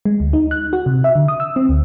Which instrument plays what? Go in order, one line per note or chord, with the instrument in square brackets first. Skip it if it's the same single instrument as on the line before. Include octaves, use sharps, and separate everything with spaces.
[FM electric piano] G#3
D2
D#4
F#6
F#4
C3
E5
D3
D#6
E6
C4
D2